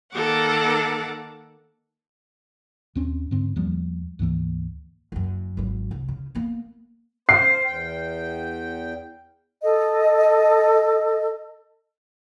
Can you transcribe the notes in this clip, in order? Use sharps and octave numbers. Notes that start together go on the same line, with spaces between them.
D#3 A#3 A4 F#5 D6
D#2 C4 C#4
G#2 D3 C4
E2 F3 G3 A#3
D2 G#2 E3 A#3
F#1 F#2
G#1 F#3
C2
C#3
A#3 B3
C5 C7
E2 G5
A4 D#5